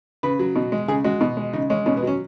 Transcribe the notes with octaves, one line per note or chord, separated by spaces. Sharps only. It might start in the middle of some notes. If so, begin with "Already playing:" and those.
C#3 B4
F#3
B2
G#3
C#3 G#4
G#3 F#4
B2
G#3
C#3 D#4
G#3 C#4
B2 C#4
B3
F#3 C#4